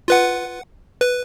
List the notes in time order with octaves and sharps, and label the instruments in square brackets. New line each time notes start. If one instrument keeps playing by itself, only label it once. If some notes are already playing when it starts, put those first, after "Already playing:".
[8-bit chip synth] F4 B4 F#5
B4